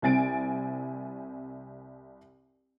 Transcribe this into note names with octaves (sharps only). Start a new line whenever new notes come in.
C2 C4 G#5 A6 D7